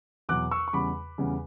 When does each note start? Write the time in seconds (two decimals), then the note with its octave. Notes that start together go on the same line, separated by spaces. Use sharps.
0.29 E2 B2 F#3 D6 F#6
0.51 C#6 E6
0.68 C#6
0.73 E2 C#3 G3 B5 D6
1.18 E2 C#3 G3